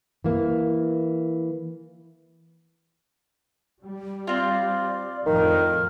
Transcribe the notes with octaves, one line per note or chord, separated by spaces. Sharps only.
E3 A#3
G3
C4 F4 D5
F2 A2 D#3 F3 A#4